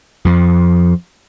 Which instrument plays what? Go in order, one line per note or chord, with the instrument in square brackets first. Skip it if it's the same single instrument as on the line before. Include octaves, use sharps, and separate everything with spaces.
[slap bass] F2 F3